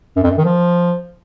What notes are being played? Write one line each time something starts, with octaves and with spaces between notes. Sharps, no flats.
F#2
F2
F#2
D#3
F3